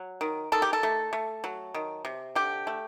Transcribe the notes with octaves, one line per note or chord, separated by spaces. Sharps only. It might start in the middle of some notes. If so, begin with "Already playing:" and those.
Already playing: F#3
D#3
D#3 A4
G4
A4
A3
A3
F#3
D#3
C3
D3 G4
A3